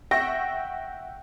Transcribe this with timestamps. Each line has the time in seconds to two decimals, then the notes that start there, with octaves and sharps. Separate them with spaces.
0.11 E5 F#5 G5 C#6 E6 A#6